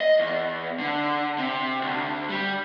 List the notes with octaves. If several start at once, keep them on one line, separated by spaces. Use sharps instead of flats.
D#5
E2
D3
C3
D2
G3